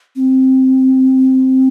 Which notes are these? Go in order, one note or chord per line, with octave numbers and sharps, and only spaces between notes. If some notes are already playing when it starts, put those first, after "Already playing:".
C4